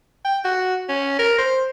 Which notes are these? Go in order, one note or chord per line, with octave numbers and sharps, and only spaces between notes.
G5
F#4
C#4
A#4
C5